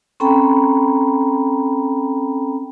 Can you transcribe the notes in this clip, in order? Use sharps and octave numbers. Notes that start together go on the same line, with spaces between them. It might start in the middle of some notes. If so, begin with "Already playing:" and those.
C4 C#4 A4 G5 A#5 B5